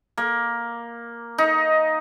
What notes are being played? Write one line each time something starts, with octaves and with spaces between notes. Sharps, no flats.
A#3
D#4